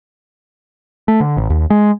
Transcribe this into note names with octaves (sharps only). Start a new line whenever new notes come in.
A3
D3
A1
D#2
G#3